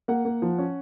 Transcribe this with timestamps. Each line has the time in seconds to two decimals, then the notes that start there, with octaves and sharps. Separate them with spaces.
0.08 A#3 F#5
0.25 A#3
0.42 F3
0.58 C#4